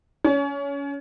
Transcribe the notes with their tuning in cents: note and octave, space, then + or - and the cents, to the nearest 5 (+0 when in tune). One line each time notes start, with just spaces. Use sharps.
C#4 +25